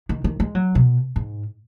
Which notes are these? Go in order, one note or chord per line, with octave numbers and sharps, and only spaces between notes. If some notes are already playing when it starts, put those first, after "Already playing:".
D#3
D#3
G#3
F#3
B2
G#2